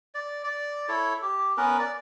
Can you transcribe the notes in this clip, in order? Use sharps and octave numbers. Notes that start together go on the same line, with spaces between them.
D5
D5
E4 A4 C#5
G4
B3 C#4 A#4 B4
D5